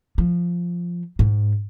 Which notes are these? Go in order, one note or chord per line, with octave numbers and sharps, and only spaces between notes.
F3
G#2